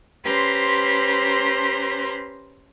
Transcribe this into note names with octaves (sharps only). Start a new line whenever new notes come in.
C#4 G4 B4 C5 A#5 C6